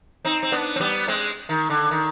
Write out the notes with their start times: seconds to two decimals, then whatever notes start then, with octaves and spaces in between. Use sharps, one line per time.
0.25 C4 D#4
0.43 C4
0.52 B3 D4
0.76 C4
0.80 G3 B3
1.08 G#3 C4
1.49 D#3
1.70 D3
1.91 D#3